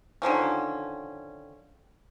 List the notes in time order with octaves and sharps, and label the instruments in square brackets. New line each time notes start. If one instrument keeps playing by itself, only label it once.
[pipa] D3 D#3 F3 C#4